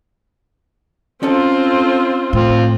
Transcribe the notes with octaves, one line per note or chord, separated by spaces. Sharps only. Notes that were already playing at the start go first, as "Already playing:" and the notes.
C4 C#4 D#4 F4 A4
A2 F3 C4 F4